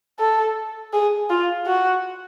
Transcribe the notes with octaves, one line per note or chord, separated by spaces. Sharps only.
A4
G#4
F4
F#4